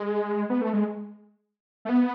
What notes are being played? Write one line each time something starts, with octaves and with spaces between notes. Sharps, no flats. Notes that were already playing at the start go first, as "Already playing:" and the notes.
Already playing: G#3
B3
A3
G#3
A3
B3